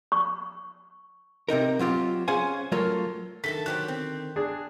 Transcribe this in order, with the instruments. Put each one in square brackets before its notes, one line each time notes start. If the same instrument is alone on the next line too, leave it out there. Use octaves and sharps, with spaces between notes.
[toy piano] C#6
[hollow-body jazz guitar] C3 C4 D#4 A#4
F#3 C4 F4 G4
C#4 G#4 C5 F5 F#5 G#5
F#3 A3 F4 A#4 C#5
[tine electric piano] D3 D#3 [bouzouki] A4 E5 A5 [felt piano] B6
[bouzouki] F#3 G4 C5 [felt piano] F#6
[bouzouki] C4
[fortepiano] D4 G#4